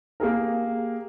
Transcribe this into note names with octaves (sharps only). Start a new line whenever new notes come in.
A#3 G4 G#4 A#4